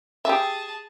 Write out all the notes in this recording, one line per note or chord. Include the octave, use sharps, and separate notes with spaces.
G4 G#4 E5 A5